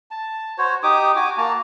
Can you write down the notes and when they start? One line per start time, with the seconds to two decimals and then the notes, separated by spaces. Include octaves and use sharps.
0.11 A5
0.58 F#4 C5 C#5
0.83 D#4 G4 D6 D#6
1.16 F#4 G#5 D6
1.38 A#3 F#4 A5 A#5